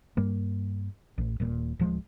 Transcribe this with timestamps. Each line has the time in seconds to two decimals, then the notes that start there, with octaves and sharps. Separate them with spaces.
0.17 G2 G3 A#3
1.18 A1
1.40 D#1 A#2
1.80 D1 F3 G#3